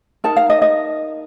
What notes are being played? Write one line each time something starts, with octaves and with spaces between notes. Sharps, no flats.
D#4 A#4 A5
F5
D#5
D#5